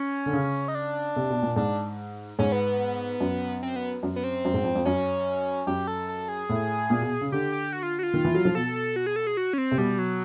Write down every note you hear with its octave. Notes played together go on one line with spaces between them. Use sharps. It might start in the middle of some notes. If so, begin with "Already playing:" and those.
Already playing: C#4
D3
C#3
D#4
D4
C3
B2
A#2
G#2 D4
G#2 C#4
B3
B3
F#2
C4
B3
F#2
B3
C4
F#2
G#2
F2
F2
F#2 C#4
F#2 G4
A4
A4
G#4
A2
A#2
B2
C#3
D3 G4
G4
F#4
F4
F#4
F4
D#3
E3
F#3
F3
B2 A4
A4
F#4
G#4
A4
G#4
F#4
C#4
C4
C3
B2 G3
F#3